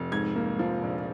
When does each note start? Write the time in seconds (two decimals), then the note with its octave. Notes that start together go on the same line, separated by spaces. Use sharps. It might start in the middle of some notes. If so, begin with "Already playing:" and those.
Already playing: F1
0.12 G#2 G#6
0.36 A#3
0.59 F3
0.83 A#1